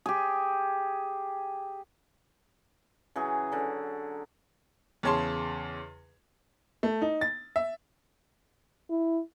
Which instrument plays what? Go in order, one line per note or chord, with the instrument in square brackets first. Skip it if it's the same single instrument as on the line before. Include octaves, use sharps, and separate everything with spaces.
[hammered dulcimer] G4 G#4
C#3 E3 F#3 G#4
D3 F#3
[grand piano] E2 C#3 C#5 A5 C6
[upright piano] A3
D#4
A6
E5
[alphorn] E4